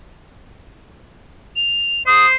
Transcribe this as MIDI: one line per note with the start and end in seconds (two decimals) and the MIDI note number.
1.56 2.03 101
2.07 2.35 72
2.07 2.26 87